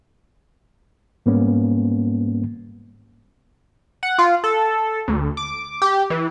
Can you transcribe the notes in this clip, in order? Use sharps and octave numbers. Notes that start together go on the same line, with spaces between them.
G#2 G3 A#3 B3 C#4
F#5
F4
A4
D2
D6
G4
E3